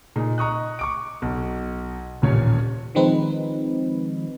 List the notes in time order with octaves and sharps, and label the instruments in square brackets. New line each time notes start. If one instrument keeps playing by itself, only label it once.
[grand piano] A#2 D#4 G#4
D#5 A#5 C#6 D#6 F#6
C#6 D6 D7
B1
D#1 A1 A#2 C#4 F4 C#5
[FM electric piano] D#3 F3 G#3 C4 D#4 B4